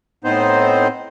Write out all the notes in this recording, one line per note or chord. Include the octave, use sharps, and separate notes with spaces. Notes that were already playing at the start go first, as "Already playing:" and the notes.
A2 B3 C4 D#4 C5